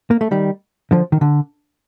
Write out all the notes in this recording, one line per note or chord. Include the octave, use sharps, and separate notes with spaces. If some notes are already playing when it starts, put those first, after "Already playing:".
A#3
A3
D#3 G3
D3 F3
D#3
D3